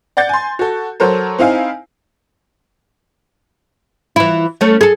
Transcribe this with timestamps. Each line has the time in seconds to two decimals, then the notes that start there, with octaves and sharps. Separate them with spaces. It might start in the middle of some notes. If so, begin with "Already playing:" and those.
0.17 D5 F#5 G6 A6
0.29 G#5 C6
0.59 F#4 A4
1.00 F#3 A4 A#4 C5
1.39 C4 D#4 E4 F5 G#5
4.16 E3 E4
4.61 A3 C#4
4.81 G#4 A4